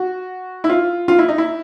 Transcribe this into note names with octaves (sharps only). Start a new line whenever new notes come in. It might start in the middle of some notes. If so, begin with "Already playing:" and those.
Already playing: F#4
E4
F4
F4
E4
D#4
E4